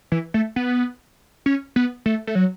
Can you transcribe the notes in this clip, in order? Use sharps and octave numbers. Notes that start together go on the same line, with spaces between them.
E3
A3
B3
C#4
B3
A3
A3
F#3